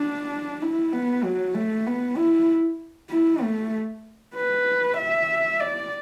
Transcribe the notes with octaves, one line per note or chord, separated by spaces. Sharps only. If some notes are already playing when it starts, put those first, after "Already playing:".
Already playing: D4
E4
B3
F#3
A3
B3
E4
E4
A3
B4
E5
D5